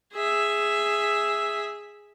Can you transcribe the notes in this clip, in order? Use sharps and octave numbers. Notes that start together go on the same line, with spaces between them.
G#4 E5